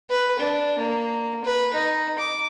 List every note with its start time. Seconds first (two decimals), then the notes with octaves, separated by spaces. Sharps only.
0.10 B4
0.39 D4
0.78 A#3
1.44 B4
1.74 D#4
2.18 D6